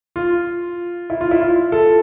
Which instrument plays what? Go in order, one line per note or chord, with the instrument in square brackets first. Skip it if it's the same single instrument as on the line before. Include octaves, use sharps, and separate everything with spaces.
[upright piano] F4
E4
F4
E4
F4
A4